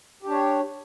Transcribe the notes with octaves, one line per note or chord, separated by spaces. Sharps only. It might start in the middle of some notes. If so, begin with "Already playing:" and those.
D4 G4 C#5